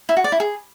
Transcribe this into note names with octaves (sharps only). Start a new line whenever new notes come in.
E4
F#4
D5
E4
G#4